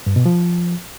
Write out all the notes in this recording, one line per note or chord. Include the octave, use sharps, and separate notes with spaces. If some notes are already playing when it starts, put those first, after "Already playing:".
G2
B2
F3